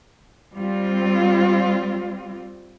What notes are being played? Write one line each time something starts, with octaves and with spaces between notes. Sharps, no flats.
G3 C4 F4